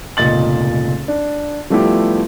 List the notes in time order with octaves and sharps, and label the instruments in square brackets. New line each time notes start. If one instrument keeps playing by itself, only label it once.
[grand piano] F1 C#2 A#2 D#5 A6 F#7
D4
F3 G3 A3 B3 E4 G4